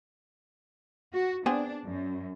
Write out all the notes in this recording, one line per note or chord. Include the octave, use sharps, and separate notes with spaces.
F#4
B3 C4 D4 G#4
F#2